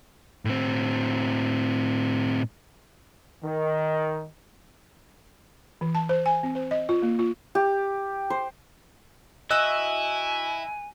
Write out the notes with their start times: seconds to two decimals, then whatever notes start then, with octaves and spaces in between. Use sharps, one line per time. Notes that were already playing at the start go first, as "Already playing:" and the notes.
0.45 A2 C4
3.43 D#3
5.81 E3
5.95 A5
6.09 C5
6.26 G#5
6.43 C4
6.55 C5
6.71 D#5
6.89 F4
7.02 A#3
7.19 F4
7.55 G4
8.30 C5
9.50 E4 F#4 D#5 F#5 G#5 E6 F#6